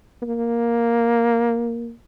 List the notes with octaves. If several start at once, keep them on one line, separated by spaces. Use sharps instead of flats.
A#3